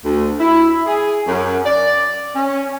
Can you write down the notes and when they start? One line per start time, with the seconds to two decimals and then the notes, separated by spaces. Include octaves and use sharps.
0.04 D2
0.39 E4
0.86 G#4
1.27 F#2
1.65 D5
2.35 C#4